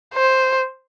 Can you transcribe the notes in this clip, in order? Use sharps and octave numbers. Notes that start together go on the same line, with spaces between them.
C5